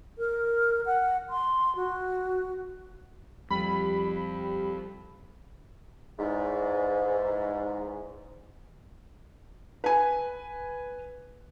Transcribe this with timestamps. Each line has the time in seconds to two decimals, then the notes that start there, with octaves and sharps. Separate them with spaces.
0.18 A#4
0.86 F#5
1.30 C6
1.76 F#4
3.50 F2 G3 B5
6.18 E2 G#2
9.84 B4 G#5